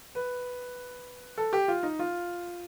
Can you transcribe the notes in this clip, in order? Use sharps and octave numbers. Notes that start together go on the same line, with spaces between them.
B4
A4
G4
F4
D#4
F4